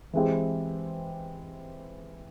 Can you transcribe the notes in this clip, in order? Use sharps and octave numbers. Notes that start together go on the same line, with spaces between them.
E3 G#3 C4 E4 G4